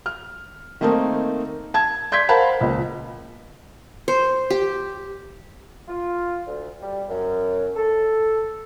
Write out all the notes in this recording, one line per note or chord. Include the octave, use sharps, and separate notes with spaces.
F6
D#3 A3 A#3 C4 D#4
A5 G#6
D5 C6 G6 G#6 B6
A#4 C5 F5 F#5 A5 B5
C#2 A#2
C5
G4
F4
D2
G3
F#2
A4